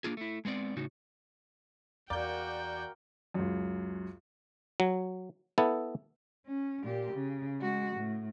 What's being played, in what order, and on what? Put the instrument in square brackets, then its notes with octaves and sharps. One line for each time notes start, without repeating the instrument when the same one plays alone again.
[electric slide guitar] A#3 D4 F4 G#4
A3 E4
G#3 B3 C4 D5
A2 C#3 D#4 F#4
[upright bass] E2 [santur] A#3 A#4 [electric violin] F#4 G5 [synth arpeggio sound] D5 G6
[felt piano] C#2 F#2
[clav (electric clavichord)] F#3
B3 E4 A4
[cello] C#4
A#2 G4
C#3
G#3 F#4
A2